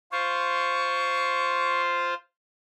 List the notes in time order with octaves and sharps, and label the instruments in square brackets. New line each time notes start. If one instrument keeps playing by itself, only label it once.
[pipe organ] F4 C5 [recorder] C#6